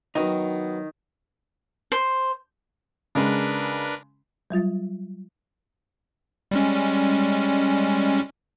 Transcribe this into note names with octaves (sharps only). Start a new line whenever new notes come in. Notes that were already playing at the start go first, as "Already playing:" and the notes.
D#3 F#3 B3 D#4
C5
C#3 G#3 D4 A#4 B4
F#3 G3 F4 A6
G3 G#3 C#4